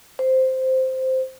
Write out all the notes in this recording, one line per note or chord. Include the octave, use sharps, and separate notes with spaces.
C5